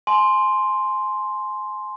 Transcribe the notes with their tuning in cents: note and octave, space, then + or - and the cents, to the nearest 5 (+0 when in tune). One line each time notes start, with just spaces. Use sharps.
G#5 +30 C6 +0